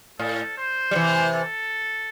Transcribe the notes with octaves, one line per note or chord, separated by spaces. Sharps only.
A2 A4
C5
G3
C3 E3
A4